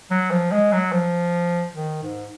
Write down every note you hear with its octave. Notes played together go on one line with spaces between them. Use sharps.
F#3
F3
G#3
F#3
F3
D#3
G#2